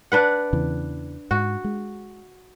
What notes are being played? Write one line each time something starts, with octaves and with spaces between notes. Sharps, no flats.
D4 B4 F#5
E2 C#3 E3
G#2 F#4
G#3